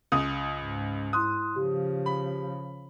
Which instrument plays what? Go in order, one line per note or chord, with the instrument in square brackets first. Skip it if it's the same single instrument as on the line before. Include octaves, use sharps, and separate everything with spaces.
[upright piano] C#2 D#6
[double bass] G#2
[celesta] E4 C6 F#6 [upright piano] D#6
[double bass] C#3 F3 [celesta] G4
[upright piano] B5